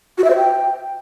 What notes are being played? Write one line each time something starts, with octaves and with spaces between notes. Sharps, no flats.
F#4
E5
C5
G5